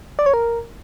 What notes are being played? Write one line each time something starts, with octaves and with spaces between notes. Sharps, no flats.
D5
C#5
A#4